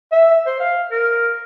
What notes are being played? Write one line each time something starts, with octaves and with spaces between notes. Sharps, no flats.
E5
C5
F5
A#4